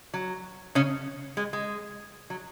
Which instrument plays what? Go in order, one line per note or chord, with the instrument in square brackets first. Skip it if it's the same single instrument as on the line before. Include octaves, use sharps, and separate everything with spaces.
[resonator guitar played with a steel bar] F#3
C#3 C#4
G#3
G#3
F#3